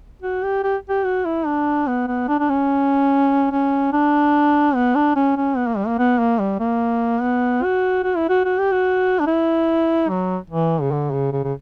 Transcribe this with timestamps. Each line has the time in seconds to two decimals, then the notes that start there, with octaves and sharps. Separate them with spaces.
0.22 F#4
0.43 G4
0.64 G4
0.89 G4
1.05 F#4
1.25 E4
1.46 D4
1.87 B3
2.08 B3
2.28 D4
2.40 D4
2.49 C#4
3.52 C#4
3.93 D4
4.75 B3
4.95 D4
5.16 C#4
5.37 C#4
5.57 B3
5.67 A#3
5.77 G3
5.87 A#3
5.99 B3
6.19 A#3
6.39 G3
6.60 A#3
7.21 B3
7.63 F#4
8.04 F#4
8.17 E4
8.29 F#4
8.45 F#4
8.59 G4
8.72 F#4
9.20 D4
9.27 E4
10.10 F#3
10.50 E3
10.82 C#3
10.92 D3
11.12 C#3
11.33 C#3
11.44 C#3